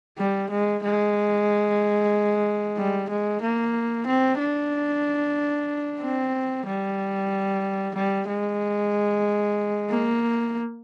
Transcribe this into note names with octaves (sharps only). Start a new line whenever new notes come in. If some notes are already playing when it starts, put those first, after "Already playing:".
G3
G#3
G#3
G3
G#3
A#3
C4
D4
C4
G3
G3
G#3
A#3